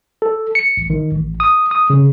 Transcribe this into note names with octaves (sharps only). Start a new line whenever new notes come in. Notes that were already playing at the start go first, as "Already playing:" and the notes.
A4
C#7
A1
D#3
A1
D#6
D#6
C#3